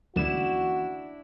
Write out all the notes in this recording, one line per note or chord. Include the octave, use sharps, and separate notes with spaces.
D2 E3 A#3 C#4 D4 E4 F#4 E7